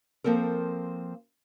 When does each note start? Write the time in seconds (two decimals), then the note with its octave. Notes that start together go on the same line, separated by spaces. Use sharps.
0.24 F3 A#3 C4 A4 A#4